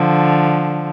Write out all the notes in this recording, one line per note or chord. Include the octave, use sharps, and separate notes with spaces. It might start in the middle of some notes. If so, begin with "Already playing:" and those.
Already playing: D3 F3